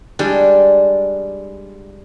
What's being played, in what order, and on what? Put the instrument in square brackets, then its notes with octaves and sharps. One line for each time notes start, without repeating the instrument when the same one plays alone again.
[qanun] G3 G#3 D4